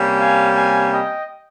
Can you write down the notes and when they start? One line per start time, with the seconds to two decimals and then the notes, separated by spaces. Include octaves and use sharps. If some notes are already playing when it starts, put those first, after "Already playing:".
Already playing: C3 G3 A#3 C#4
0.18 F5 G#5
0.55 F5 G#5
0.91 D#5 G5